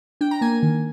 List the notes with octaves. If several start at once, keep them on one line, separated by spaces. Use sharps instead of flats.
D4 G5
A#5
A#3 G#5
D#3